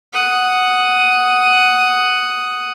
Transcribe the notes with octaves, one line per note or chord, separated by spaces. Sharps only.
F#5 D#6